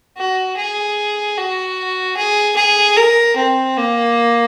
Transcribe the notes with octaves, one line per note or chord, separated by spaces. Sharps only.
F#4
G#4
F#4
G#4
G#4
A#4
C4
A#3